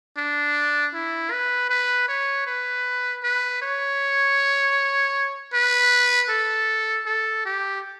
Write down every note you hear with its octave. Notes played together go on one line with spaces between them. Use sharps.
D4
E4
B4
B4
C#5
B4
B4
C#5
B4
A4
A4
G4